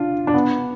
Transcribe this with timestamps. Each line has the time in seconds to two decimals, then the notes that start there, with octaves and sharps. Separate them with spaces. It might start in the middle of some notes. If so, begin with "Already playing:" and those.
Already playing: D4 F4
0.27 D4
0.34 B3